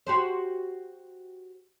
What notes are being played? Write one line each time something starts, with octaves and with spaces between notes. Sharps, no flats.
F#4 G4 C5